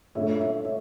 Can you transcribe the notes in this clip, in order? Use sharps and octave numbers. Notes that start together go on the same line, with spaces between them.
A#2 A3 D4 C#5 E5
C#5 E5
C#5 E5